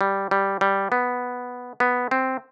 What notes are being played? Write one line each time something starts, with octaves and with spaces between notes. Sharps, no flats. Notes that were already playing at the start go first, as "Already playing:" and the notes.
G3
G3
G3
B3
B3
C4